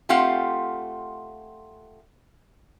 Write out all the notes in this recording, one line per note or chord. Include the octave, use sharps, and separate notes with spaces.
A3 C4 F4 G4 F5 F#5